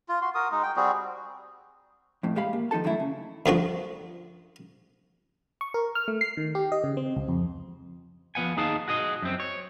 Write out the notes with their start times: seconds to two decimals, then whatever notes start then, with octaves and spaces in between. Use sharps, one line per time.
0.09 F4
0.22 F#4 C6
0.35 F#4 A#4 D#6
0.52 G#3 D#4
0.63 G5
0.76 G3 C4 F#4 G#4
2.23 F2 A2
2.36 A#2 G#3 G4 F5 B5
2.53 A#3
2.71 D#3 F3 D#4 A4 A5
2.84 F#2 D#3 F#3 A3 E4
3.00 C#3
3.46 D2 D3 F3 F#4
5.61 C#6
5.74 A#4
5.95 F6
6.08 A3
6.21 C7
6.37 D#3
6.55 G4
6.72 D#5
6.84 C#3
6.97 C4
7.16 C#2
7.28 F2
8.35 F3 B3 F#5 G#5
8.57 D#2 D#4 G#4 F5 A5
8.88 F#4 G#4 D#5
9.22 F#2 C4
9.40 C#5